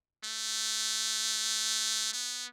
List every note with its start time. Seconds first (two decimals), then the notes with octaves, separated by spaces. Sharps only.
0.24 A3
2.13 B3